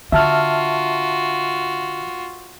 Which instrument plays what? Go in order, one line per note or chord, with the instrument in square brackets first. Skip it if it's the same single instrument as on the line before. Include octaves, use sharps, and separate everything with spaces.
[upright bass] D3 [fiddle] F4 F#4 [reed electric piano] E5 A5 F6